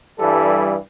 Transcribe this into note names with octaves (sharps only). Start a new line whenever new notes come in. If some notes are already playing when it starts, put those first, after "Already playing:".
G2 E3 G3 A4